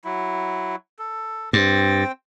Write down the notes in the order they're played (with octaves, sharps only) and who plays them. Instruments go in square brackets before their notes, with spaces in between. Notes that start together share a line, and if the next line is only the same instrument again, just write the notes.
[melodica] F#3 E4
A4
[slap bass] G2 [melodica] C4 G5